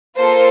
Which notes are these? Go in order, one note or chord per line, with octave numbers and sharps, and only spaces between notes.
A#3 F4 A4 C5